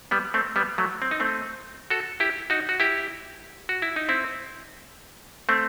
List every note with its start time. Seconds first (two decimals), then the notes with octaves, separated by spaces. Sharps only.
0.11 G3 B3
0.34 A3 C4
0.56 G3 B3
0.78 F#3 A3
1.02 C4
1.11 D#4
1.20 A3 C4
1.90 F#4 A4
2.20 E4 G4
2.50 D#4 F#4
2.69 F#4
2.80 E4 G4
3.69 F#4
3.82 E4
3.96 D#4
4.09 C4 E4
5.49 A3 C4